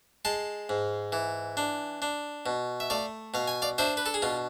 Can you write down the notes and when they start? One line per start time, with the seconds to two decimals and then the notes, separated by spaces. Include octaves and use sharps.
0.25 G#3 A5 C6
0.69 G#2
1.12 E3
1.57 D4
2.02 D4
2.46 B2
2.80 E5
2.90 A3 D5 F5
3.34 B2 F5
3.48 G#5
3.62 D5 F5
3.78 D4 C5 E5
3.97 B4
4.06 A4
4.14 G#4
4.22 B2 F4